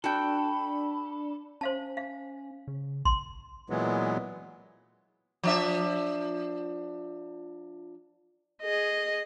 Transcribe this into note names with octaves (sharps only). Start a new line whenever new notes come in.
D4 F#4 A4 G5 B5
C#4 C5 F5 A5
F5
C#3
A#1 C6
A#2 E3 F#3 G#3 B3
F3 D4 E5
G#4 D#5